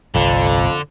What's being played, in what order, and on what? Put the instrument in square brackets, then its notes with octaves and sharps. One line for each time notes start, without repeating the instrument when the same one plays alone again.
[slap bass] G1 C2 [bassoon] F2 [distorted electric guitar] D3